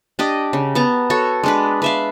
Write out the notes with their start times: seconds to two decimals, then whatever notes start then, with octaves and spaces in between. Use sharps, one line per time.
0.19 D4 G4 D#5
0.53 C#3
0.75 B3 A5 A#5
1.10 F#4 A4 C#5
1.44 G#3 D4 B4
1.82 B4 E5 F5